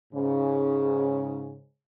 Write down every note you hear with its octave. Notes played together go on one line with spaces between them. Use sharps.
G#2 C#3